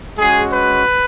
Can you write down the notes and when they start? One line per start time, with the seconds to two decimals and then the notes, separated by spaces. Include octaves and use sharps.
0.18 G#3 C#4 F#4 G#4
0.51 B4